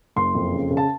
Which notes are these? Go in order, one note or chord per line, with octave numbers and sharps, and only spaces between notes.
F#1 C6
F2
C#3
C#3
A5